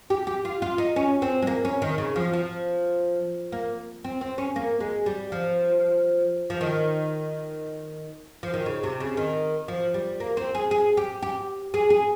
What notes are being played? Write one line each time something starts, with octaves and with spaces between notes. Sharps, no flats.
G4
G4
F4
F4
D#4
C#4
C4
G#3
A#3
C#4
D#3
C#3
F3
F3
A#3
C4
C4
C#4
A#3
G#3
G3
F3
F3
D#3
F3
D#3
C#3
C3
C#3
D#3
F3
G3
A#3
C4
G#4
G#4
G4
G4
G#4
G#4